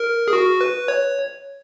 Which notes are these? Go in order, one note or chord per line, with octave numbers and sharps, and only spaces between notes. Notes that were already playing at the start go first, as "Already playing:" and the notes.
Already playing: A#4
G#4
F#4
B4
C#5